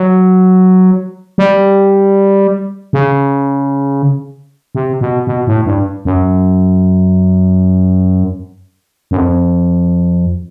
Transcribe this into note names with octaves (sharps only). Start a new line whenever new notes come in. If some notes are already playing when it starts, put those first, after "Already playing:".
Already playing: F#3
G3
C#3
C3
B2
B2
A2
G2
F#2
F#2
F2